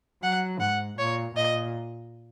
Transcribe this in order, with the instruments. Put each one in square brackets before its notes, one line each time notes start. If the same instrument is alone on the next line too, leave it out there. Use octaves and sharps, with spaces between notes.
[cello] F#3 [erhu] F#5
[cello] G#2 [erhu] F#5
[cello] A#2 [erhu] C#5
[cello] A#2 [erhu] D#5